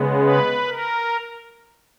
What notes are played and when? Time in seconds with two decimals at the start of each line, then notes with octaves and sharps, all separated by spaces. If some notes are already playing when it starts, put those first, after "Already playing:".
Already playing: C#3 G#3 B3
0.20 B4
0.68 A#4